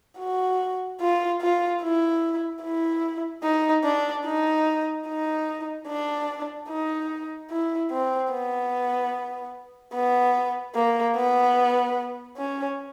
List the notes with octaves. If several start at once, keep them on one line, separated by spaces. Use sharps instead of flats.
F#4
F4
F4
E4
E4
D#4
D4
D#4
D#4
D4
D#4
E4
C4
B3
B3
A#3
B3
C#4